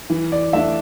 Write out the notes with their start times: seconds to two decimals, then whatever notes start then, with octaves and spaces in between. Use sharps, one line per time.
0.10 E3
0.32 D5
0.53 A3 D4 E5